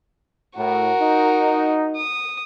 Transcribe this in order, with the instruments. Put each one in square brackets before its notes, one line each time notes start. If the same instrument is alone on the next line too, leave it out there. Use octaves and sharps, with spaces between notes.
[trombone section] A2 [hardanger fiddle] F#4 A#4
[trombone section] D#4
[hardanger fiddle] D#6